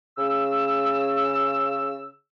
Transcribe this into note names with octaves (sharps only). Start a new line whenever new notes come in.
C#3 E6